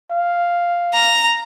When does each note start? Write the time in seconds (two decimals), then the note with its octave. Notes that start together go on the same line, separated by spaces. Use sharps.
0.11 F5
0.93 A#5